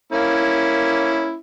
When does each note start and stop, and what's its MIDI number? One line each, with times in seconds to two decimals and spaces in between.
0.12 1.36 58
0.12 1.36 61
0.12 1.36 64